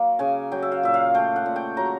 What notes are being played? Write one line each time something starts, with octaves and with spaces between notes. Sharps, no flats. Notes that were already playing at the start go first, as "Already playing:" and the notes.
Already playing: F#3 A#3
C#3 G#5
F#3 G5
E5
F5
A#2 E5
F5
A3 G5
F#5
A#2
G5
F#3 A#5